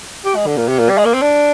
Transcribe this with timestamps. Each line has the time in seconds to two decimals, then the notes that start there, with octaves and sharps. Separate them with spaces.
0.25 G4
0.35 G#3
0.46 D3
0.57 A#2
0.68 C3
0.79 A#2
0.89 G3
0.98 G#3
1.05 A#3
1.13 C4
1.22 D4